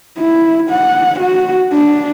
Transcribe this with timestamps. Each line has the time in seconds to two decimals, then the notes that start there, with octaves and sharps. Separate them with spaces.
0.18 E4
0.70 F#5
1.19 F#4
1.72 D4